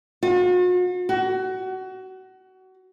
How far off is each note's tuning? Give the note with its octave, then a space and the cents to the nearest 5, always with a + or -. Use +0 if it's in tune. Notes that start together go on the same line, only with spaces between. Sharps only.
F#4 -45
F#4 +25